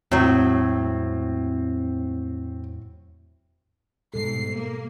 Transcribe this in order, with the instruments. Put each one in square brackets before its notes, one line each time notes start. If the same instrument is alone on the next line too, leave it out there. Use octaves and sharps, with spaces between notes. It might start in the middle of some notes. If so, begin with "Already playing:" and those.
[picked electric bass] E2 G#3 A3 [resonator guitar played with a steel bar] A2 F#3 [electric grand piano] C4
[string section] G#2 C7 [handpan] B2 G3 A4
[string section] A#3